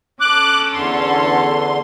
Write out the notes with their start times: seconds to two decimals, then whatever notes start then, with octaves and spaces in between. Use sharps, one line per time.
0.21 C#4 A4 D6 F#6
0.74 E2 D3 C6